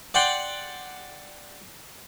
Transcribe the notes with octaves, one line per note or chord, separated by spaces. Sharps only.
D5 F#5 G5 C6